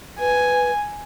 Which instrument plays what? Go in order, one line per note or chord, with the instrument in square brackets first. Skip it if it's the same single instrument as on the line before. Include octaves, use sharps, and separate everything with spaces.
[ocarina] B4 [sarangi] G#5